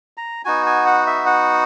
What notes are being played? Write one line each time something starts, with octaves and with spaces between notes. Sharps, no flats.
A#5
B3 D#4 F#4 G#5
G#5
F#5
E5
F#5